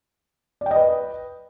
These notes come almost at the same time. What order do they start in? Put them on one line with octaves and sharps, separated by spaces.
D5 G5 D#5 B4